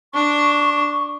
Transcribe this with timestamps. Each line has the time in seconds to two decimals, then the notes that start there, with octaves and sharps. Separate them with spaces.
0.14 D4 C#6